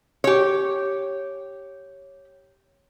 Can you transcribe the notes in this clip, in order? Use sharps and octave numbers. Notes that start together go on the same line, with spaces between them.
G4 C#5